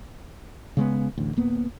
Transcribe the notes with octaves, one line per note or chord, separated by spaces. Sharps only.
C#3 G#3 B3
A1 D2
D1 A#3 B3